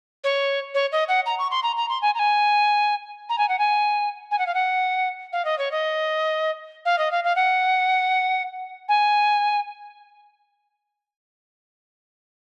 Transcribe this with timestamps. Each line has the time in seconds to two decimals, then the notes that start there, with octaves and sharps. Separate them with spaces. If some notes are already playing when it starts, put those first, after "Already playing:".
0.24 C#5
0.75 C#5
0.92 D#5
1.09 F#5
1.26 A#5
1.39 C#6
1.51 C6
1.63 A#5
1.77 A#5
1.89 C6
2.02 G#5
2.15 A#5
2.19 G#5
3.29 A#5
3.38 G#5
3.49 F#5
3.59 G#5
4.31 G#5
4.39 F#5
4.47 F5
4.54 F#5
5.33 F5
5.45 D#5
5.58 C#5
5.71 D#5
6.85 F5
6.98 D#5
7.11 F5
7.24 F5
7.36 F#5
8.89 G#5